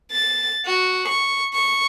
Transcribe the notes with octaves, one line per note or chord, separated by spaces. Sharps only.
A6
F#4
C#6
C#6